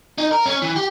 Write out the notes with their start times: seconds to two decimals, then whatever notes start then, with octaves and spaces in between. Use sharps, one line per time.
0.18 D#4
0.31 A#4
0.46 C#4
0.62 E3
0.76 G4